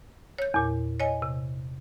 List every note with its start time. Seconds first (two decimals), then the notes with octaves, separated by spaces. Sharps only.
0.38 C#5 G6
0.54 E2 A#2
1.00 C#5 D#5 G#5
1.22 C3